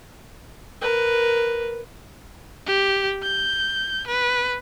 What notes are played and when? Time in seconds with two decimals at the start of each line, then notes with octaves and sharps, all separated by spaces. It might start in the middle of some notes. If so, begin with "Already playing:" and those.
0.81 A#4 B4
2.66 G4
3.23 G6
4.07 B4